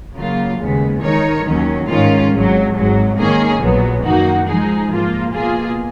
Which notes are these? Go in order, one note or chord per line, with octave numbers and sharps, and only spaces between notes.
C#3 F#3 A#3 F4
D#2 C#3 G#3 B3
D#3 G#3 D#4 A#4 C#5
D#2 D#3 F#3 C#4
G#2 D#3 G#3 C#4 F4
G#1 G#2 F#3
G#1 G#2 F#3
G#2 D#3 A#3 C#4 G#4
A#1 A#2 F#3 B3
F#2 D#3 A#3 D#4 F#4
F3 G#3 D#4 G#4
G#2 F3 A#3 F4
B2 A#3 F4 G#4